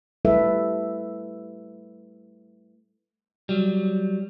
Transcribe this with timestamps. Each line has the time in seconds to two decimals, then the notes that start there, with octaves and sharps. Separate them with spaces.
0.25 G3 A3 E4 A4 B4 E5
3.49 F#3 G3